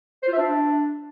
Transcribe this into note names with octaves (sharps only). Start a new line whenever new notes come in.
C5
F4
E5
D4